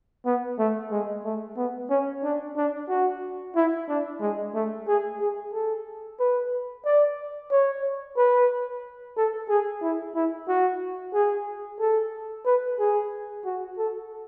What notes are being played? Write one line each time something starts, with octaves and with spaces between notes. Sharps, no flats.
B3
A3
G#3
A3
B3
C#4
D4
D4
F#4
E4
D4
G#3
A3
G#4
G#4
A4
B4
D5
C#5
B4
A4
G#4
E4
E4
F#4
G#4
A4
B4
G#4
F#4
A4